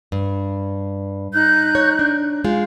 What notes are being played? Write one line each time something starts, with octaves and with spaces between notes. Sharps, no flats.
G2
D#4 F#6 G6
C#5
D4
G#3 F4 F5